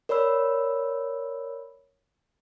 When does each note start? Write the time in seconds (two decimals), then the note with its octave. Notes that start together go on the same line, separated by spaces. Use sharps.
0.09 A#4 C#5 D5 B5 E6